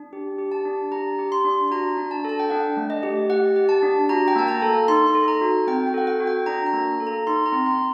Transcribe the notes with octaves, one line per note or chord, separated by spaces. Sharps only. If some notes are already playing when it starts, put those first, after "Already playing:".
Already playing: D4
G4
G4
A5
D4
G4 A#5
G4
C6
D4
F#4 A#5
D4
A5
A4 A5
G5
D4 F#5
A3
D#5
G4
G4 F#5
G4
A5
D4
F#4 A#5
G5
A#3 A5
A#5
A4
D#4 C6
A4
A#5
F#4
C4 G5
G5
A4 F#5
G5
F#4
G5
D4 A#5
A#5
A#3
A4
A#5
D#4 C6
A#5
C4
C6